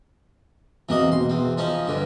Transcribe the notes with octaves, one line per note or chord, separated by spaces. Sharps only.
E2 E3 A#3 C4 F#4 D#5
B2 F#4 C6
E2 C4
F3 C#4 D#4 D5 D#5
G2 D3 D4 B4 C#5